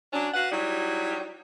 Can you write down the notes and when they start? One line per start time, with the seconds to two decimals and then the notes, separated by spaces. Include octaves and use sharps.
0.13 F#3 C#4 D4
0.34 F#4 B4 F5 F#5
0.52 F#3 G3 D#4 E4